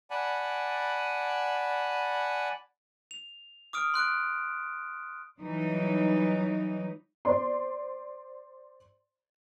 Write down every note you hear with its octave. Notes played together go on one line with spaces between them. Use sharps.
D5 F#5 G#5 A5 B5
F7
D6 D#6 F6 D7
C6 F#6 D7
E3 F#3 G3 D#4
C5 D5 C6